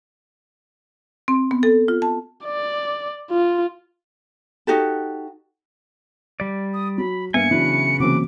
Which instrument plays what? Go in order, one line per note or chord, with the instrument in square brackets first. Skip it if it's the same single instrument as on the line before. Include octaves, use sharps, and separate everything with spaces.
[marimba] C4
B3
A4
F4
A5
[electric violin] D5
F4
[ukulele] D#4 F#4 G4 A4
[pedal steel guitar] G3 D5
[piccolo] D#6
[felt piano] F#3 [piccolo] B5
[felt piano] G2 A#3 [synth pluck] B3 E5 [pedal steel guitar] G#5 [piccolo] C#7
[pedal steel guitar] C#3 B4 [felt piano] E3 F#3 D4
[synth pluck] C3 E3 A#3 [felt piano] F#3 C4 C#4 [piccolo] D6